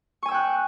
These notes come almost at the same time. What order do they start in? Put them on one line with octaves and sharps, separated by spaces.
C#6 G#5 E6 G5 F#6